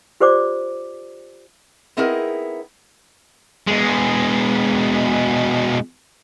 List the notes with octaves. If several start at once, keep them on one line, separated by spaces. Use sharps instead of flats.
F4 G4 C5 D5 D6
B3 C4 D#4 E4 G#4 A#4
B2 G#3